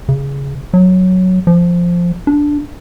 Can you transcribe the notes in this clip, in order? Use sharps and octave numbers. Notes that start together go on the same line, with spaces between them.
C#3
F#3
F3
D4